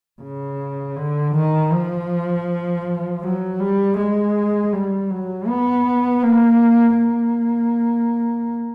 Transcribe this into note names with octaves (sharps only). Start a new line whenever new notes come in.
C#3
D3
D#3
F3
F#3
G3
G#3
G3
F#3
B3
A#3
A#3